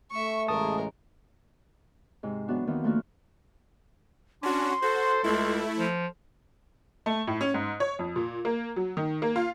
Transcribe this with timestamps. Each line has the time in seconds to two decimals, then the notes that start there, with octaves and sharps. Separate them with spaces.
0.11 A3 E5 C#6
0.48 A1 C#3 G#3 A#4 A5 D#6
2.23 G#2 C3
2.48 E3 F#3 B3 D4 F#4
2.67 D#2 D#3 E3 B3 C4
2.83 F3 A3 A#3 D4 F#4 A#4
4.43 C#4 D4 F#4 C6
4.82 F#4 A4 C5
5.24 C#2 A3 E4
5.79 F3
7.06 A3
7.27 A2
7.41 C#4
7.54 G#2
7.80 C#5
7.99 F2
8.16 A#2
8.45 A#3
8.76 F#3
8.97 D#3
9.22 A#3
9.36 F4